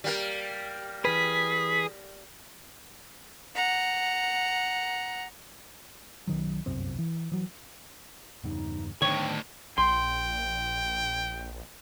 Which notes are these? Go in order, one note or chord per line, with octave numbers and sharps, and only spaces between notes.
G3 A#3 A#4
E3 G#4 B4 B6
F#5 A#5
B1 D#3 F#3
G1 C2 F#2 C4
E3
E3 F#3
E2 G2 C#3 D#4
D2 A2 D#3 B3 D4 C#5 G5
A#1 G5 C6